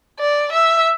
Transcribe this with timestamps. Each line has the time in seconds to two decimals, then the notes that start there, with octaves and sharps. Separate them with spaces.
0.19 D5
0.52 E5